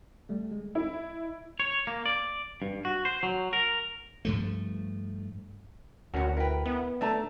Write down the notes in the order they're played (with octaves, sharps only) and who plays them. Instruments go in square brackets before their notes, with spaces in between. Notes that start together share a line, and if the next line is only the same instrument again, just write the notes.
[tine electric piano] G3 A3
G#3
[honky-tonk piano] E4 [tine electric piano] D#5
[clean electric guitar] C#5
A#3
D5
G2
F#4
C5
F#3
A#4
[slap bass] G2 F3 A3
[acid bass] D2 [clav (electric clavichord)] C#4 F#4 [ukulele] A#4 F#5
[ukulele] E4 G5 [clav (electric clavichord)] A#4 B4
[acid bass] B3 [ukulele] E4
[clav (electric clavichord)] A3 D4 E5 [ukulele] D5 A5 A#5